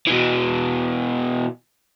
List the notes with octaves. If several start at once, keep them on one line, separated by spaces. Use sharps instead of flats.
B2 E3